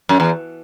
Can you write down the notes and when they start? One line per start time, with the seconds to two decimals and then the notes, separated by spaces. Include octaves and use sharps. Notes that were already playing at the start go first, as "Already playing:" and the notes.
0.09 F#2
0.20 E2